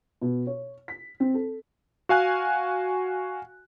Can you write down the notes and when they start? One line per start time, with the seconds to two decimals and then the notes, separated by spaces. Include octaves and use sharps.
0.21 B2
0.47 C#5
0.88 B6
1.20 C4
1.34 A4
2.09 F#4 F5 G#5 F#6